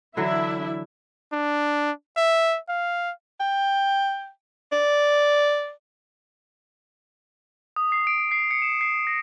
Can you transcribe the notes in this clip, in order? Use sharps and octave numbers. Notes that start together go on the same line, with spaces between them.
D3 E3 F#3 D4 E4 E5
D4
E5
F5
G5
D5
D#6
C7
D7
C7
C#7
E7
C7
A#6